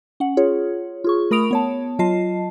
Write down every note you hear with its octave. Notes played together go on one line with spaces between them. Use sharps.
C#4 F#5
F4 G#4 C#5
F4 G#4 C#6
A3 A#4 B5 D#6 D7 F7
B3 C#5 A5
F#3 F4 D#5 A5 C7